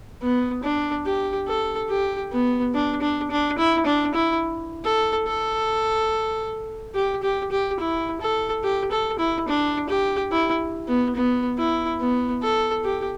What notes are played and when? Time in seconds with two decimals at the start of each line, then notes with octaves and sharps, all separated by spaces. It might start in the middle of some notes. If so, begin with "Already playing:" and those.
0.22 B3
0.63 D4
1.06 G4
1.48 A4
1.89 G4
2.32 B3
2.74 D4
3.02 D4
3.31 D4
3.58 E4
3.86 D4
4.14 E4
4.84 A4
5.27 A4
6.95 G4
7.23 G4
7.52 G4
7.80 E4
8.21 A4
8.63 G4
8.91 A4
9.19 E4
9.48 D4
9.89 G4
10.32 E4
10.88 B3
11.15 B3
11.58 E4
12.01 B3
12.43 A4
12.84 G4